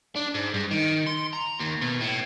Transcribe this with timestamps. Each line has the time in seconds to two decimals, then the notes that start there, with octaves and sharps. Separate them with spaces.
0.16 D4
0.35 G#2
0.54 G2
0.71 D#3
1.07 C6
1.33 A#5
1.60 D#2
1.82 B2
2.01 A2